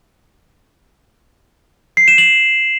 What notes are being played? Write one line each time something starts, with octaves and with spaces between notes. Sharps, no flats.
C7
E7
F#7